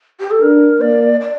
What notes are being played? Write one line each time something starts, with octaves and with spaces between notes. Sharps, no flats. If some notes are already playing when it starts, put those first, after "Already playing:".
G4
A4
D4 A#4
A#3 D5
D5